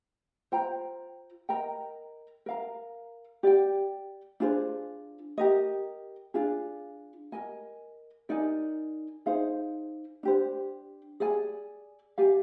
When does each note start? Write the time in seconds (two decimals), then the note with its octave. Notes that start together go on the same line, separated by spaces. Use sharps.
0.52 F4 C5 G5 A#5
1.49 A#4 D#5 G5 A#5
2.46 A#4 F5 A#5
3.43 G4 D5 G5
4.40 D4 F4 G#4 C5
5.37 G4 A#4 D#5
6.34 D4 F4 G#4
7.32 A#4 D#5 G#5
8.29 D#4 A#4 D5 G#5
9.26 D#4 G#4 C5 F5
10.23 D4 G4 C5
11.20 G#4 D5 G#5
12.18 G4 D5 F5 G#5